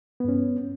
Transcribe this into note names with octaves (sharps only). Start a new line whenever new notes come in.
G2 B3 C#4